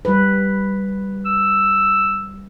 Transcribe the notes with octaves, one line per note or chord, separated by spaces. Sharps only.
G3 B4
E6